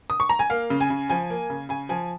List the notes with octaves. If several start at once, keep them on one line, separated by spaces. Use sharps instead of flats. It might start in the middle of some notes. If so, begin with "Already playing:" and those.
D#6
C#6
A#5
G#5
A#3 F5
C#3
G#5
C#3
F3 G#5
A#3
C#3
C#3 G#5
F3 G#5